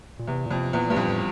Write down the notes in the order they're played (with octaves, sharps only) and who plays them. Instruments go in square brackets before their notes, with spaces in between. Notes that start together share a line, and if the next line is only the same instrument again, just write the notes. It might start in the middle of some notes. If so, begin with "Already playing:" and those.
[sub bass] A#2
[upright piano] E2 [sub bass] C3
[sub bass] A#2
[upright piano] F2 [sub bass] C3
[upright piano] E2 [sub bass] A#2
[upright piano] G2
[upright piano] F2 [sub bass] A#2
[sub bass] A2